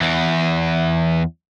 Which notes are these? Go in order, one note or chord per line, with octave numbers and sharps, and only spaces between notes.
E2 E3